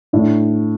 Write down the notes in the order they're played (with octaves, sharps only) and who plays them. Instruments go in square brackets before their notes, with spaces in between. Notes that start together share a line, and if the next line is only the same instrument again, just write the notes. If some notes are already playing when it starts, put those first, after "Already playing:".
[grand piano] A2 [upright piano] D4